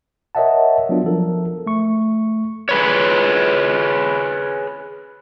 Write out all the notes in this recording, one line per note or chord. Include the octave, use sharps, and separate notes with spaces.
A#4 C#5 D#5 E5 F#5 A5
F#3 B3 D4 F4
F3 A4 A#4
A3 C#6
G#4 B4 C#5